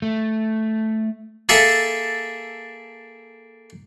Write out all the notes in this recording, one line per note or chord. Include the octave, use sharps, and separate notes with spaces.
A3
A#3 G#4 A4 E5 A5